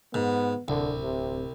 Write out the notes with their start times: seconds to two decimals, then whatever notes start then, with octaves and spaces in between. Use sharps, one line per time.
0.14 G#2 B3
0.68 D1 C2 D3
1.01 C3